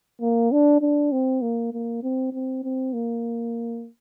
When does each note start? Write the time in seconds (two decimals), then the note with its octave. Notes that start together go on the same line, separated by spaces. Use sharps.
0.21 A#3
0.52 D4
0.81 D4
1.12 C4
1.42 A#3
1.73 A#3
2.03 C4
2.33 C4
2.64 C4
2.93 A#3